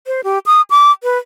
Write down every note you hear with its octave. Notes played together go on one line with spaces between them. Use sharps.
C5
G4
D#6
D6
B4